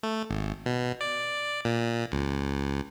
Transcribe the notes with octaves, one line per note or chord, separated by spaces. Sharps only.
A3
G#1
B2
D5
A#2
C#2